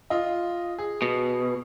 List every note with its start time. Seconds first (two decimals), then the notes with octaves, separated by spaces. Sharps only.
0.10 F4 D#5
0.78 G#4
1.02 B2